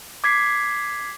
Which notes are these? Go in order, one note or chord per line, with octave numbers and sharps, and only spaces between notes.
D6 G#6 B6 C7